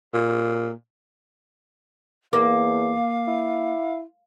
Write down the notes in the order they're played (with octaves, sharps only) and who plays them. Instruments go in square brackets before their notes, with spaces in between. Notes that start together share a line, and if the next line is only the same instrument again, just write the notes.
[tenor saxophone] A#2
[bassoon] E2 [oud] A#3 [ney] F5 [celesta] D6
[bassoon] E4